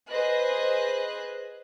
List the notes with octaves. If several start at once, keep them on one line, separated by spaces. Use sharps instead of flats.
G#4 B4 C5 D#5 F#6